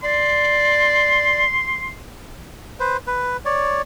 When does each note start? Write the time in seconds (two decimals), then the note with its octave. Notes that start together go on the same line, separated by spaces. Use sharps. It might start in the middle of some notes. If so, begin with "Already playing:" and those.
0.03 D5 C6
2.80 B4 C5
3.07 B4
3.45 C#5 D5